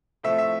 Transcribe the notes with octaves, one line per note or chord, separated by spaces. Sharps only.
A2 F3 A3 C4 E5
E5